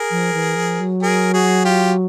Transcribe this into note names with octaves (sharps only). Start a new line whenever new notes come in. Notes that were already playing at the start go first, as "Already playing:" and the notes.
Already playing: G#4 A#4
F3
E3
F3
F#3
G#4 A#4
F#4 G#4
F4 G4